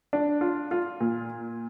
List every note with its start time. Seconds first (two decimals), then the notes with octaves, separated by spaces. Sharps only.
0.13 D4
0.41 F4
0.71 F4
1.00 A#2